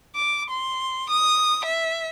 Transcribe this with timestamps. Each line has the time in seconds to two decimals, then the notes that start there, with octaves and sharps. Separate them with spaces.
0.15 D6
0.50 C6
1.10 D#6
1.65 E5